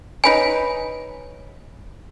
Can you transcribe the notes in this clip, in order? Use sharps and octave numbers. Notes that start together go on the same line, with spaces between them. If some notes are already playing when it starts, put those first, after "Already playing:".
D#4 B4 C#5 G#5